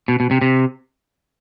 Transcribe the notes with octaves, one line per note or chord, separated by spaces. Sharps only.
B2
B2
C3
C3